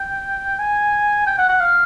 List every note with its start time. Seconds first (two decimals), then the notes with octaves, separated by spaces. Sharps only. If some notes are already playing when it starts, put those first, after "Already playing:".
Already playing: G5
0.59 G#5
1.27 G5
1.38 F#5
1.49 F#5
1.60 F5